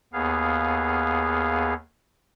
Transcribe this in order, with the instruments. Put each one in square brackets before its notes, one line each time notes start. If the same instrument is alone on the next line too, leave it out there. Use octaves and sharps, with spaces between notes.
[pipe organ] D#2 B3 G#4 F5